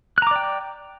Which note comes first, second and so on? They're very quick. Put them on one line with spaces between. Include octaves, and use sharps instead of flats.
F#6 A#5 D6 D5 G5